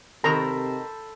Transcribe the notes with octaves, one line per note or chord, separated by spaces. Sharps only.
C3 D#3 A4 A#4 C5 A#5 B5